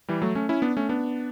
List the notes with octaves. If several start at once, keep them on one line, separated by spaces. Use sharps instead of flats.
E3 G3
F#3 A3
A3 C#4
C#4 E4
B3 D4
A3 C#4
B3 D4